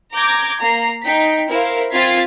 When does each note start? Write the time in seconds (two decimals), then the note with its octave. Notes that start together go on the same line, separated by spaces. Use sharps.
0.14 A#5 D6 G6 G#6 A#6
0.61 A#3 A#5 C7
1.03 D#4 G5 B6
1.50 E4 A#4 C5 F5
1.91 C4 F4 G#6 A6 B6 C7